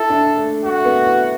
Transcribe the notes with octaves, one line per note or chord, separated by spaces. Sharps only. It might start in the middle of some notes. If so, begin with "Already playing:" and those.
Already playing: E4 A4
D4
A3
A3 F#4
B3
E4